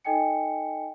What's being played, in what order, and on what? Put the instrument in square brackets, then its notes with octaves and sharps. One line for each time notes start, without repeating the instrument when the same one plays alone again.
[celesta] D#4 A4 D#5 G5 G#5 C#7